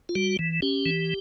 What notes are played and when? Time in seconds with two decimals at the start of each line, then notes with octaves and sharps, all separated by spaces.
0.09 F4
0.15 G3 F#4
0.39 E3
0.62 C#4 G4
0.86 E3